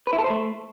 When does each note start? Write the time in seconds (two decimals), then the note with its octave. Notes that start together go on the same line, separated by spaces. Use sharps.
0.07 B4
0.13 E4
0.19 A4
0.24 C5
0.30 A3